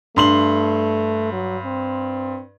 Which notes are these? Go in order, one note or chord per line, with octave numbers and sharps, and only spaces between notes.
G2 A3 C6 F#7
F#3
C4